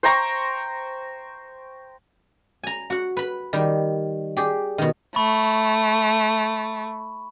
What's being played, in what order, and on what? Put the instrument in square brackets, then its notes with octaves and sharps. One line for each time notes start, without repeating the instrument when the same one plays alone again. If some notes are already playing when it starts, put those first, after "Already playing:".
[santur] C5 G5 A#5 C#6
[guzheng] G#5 A#5
F#4 F#5
B4 B5
D#3 G3
G4 G#4 D5
B2 D#3
[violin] A3 [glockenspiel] B5 C#6